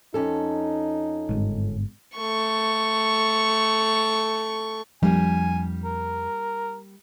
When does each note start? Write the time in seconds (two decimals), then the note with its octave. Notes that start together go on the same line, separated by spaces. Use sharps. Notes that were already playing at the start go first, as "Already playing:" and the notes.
0.14 F2 C#4 D#4 A4
1.29 G1 G#2
2.17 A3 C#6
5.03 F2 F3 G3 A#3 D4 G#5
5.84 A#4